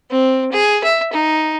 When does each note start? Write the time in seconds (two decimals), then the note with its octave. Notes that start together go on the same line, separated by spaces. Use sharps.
0.10 C4
0.52 G#4
0.84 E5
1.13 D#4